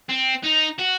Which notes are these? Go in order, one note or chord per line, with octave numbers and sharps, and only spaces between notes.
C4
D#4
F#4